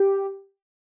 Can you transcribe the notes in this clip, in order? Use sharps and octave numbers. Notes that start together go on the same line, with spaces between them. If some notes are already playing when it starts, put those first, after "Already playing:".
Already playing: G4